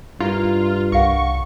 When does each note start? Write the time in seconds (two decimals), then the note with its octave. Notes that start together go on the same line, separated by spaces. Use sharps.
0.20 G2 E4 F4 A#4
0.92 C2 A#4 F5 F#5 C#6